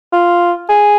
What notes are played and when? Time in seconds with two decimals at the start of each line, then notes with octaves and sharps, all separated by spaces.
0.12 F4
0.69 G#4